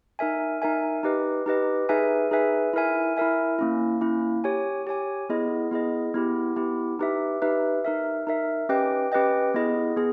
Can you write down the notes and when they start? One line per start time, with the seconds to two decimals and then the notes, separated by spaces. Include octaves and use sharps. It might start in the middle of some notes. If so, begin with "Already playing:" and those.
0.19 D#4 A#4 E5 G#5
0.62 D#4 A#4 E5 G#5
1.03 D#4 G4 B4 D#5
1.46 D#4 G4 B4 D#5
1.89 D#4 G#4 B4 E5 G#5
2.31 D#4 G#4 B4 E5 G#5
2.73 E4 A#4 E5 G#5
3.17 E4 A#4 E5 G#5
3.59 A#3 C#4 E4
4.01 A#3 C#4 E4
4.44 G4 C#5 G#5
4.87 G4 C#5 G#5
5.29 B3 E4 G#4 D#5
5.71 B3 E4 G#4 D#5
6.14 B3 E4 G4
6.56 B3 E4 G4
6.99 D#4 G4 B4 E5
7.42 D#4 G4 B4 E5
7.85 D#4 A#4 E5
8.27 D#4 A#4 E5
8.69 C#4 G4 B4 D#5 G5
9.12 C#4 G4 B4 D#5 G5
9.54 B3 E4 G#4 D#5
9.96 B3 G#4